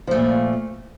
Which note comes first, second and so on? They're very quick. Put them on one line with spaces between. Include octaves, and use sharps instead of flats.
F3 A3 A#2